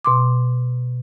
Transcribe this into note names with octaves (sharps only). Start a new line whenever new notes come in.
B2 C6 D6